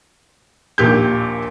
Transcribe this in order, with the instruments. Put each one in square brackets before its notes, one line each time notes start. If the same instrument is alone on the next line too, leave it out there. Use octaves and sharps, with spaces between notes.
[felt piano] A#1 D#2 A#2 G4 G6